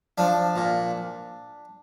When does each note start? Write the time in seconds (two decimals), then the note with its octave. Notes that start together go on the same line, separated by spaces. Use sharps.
0.18 F3 D4
0.56 A#2